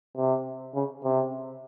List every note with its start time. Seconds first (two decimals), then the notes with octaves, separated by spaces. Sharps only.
0.16 C3
0.74 C#3
1.04 C3